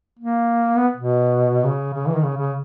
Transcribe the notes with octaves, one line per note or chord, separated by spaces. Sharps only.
A#3
B3
B2
C#3
C#3
E3
D#3
C#3
C#3